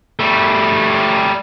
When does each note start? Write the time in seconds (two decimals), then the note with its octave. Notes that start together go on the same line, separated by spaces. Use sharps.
0.19 G3 A3